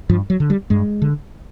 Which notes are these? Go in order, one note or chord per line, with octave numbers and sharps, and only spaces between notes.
G2 F3
F#3
D3
G3
G2 G#3
D3